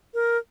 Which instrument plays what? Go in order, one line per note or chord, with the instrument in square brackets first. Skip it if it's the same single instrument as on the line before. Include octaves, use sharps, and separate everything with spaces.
[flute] A#4